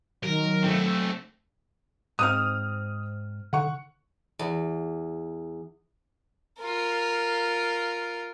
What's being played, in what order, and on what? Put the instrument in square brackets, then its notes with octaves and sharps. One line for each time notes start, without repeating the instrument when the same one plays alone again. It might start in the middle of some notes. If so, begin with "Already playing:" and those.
[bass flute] D#3 [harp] F#3 [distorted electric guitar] A#4
[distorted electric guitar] A3 C4
[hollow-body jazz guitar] G#2 C4 [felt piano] D#6 F6
[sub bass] D3 [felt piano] F#5 C#6
[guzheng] E2
[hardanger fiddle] F4 A#4